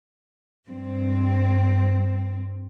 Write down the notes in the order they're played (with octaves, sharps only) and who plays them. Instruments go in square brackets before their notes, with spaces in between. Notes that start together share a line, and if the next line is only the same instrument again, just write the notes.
[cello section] G2 C4